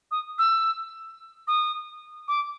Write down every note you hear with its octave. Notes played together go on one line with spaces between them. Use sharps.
D#6
E6
D#6
D6